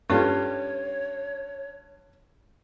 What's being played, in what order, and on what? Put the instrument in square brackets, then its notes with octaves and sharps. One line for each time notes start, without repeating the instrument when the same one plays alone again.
[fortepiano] G2 G3 F4 [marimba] C#4 G4 A4 [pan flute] C#5